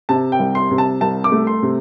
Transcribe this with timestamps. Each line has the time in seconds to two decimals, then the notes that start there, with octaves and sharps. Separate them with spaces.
0.09 C3 A5
0.32 G5
0.39 C2
0.55 C6
0.71 C3
0.78 A5
1.01 C2 A5
1.24 D6
1.32 A3
1.47 C6
1.63 C3